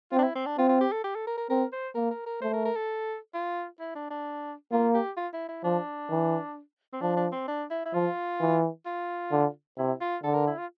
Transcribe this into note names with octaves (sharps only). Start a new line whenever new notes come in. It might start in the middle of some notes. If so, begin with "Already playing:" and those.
C4 F4
D4
E4
C4
D4
C4 F4
F4
G4
A4
G4
A4
A#4
A#4
C4 A#4
C5
A#3 A#4
A#4
A#4
A3 C5
A#4
A#4
A4
F4
E4
D4
D4
A#3 F4
G4
F4
E4
E4
F3 D4
E3
C4
F3 D4
D4
C4
D4
E4
E4
F3 F4
E3
F4
D3
C3 E4
F4
D3 A4
A#4
E4
F4